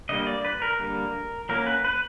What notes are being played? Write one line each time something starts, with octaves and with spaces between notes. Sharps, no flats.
D3 G3 A#3 D#5
D5
B4
A#4
D3 G3 A#3
F#3 A#3 C#4 A#4
B4
B4